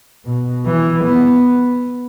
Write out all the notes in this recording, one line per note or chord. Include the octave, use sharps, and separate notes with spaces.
B2
E3
B3